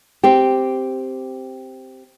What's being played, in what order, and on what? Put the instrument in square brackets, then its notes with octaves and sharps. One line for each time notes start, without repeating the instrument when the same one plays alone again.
[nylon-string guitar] C4 G4